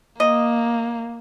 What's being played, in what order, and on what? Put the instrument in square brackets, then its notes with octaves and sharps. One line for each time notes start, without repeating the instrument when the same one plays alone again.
[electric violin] A#3 [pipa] D#5